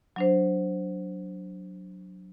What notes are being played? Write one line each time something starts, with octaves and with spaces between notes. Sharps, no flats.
F#3 D4 C5